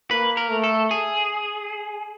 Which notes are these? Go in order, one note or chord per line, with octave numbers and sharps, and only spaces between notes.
A#3 B4
A#4
A3
A4
G#4